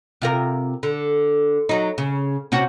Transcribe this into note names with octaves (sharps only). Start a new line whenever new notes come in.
C3 F4 A#4
D3
F#3 D#4
C#3
C3 C#4 F#4